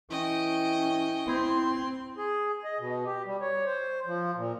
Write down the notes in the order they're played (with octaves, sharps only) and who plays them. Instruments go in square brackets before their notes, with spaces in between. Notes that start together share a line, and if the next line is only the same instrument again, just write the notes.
[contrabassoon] E3 [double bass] C#4 [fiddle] D#5 G5
[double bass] C4 [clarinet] E4 [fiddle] C6
[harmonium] G#4
D#5
B2
G4
G3
C#5
C5
F3
A#2